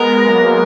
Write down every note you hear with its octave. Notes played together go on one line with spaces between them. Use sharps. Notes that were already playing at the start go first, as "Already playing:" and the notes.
Already playing: G#3 B3 A#4
F#3 A#3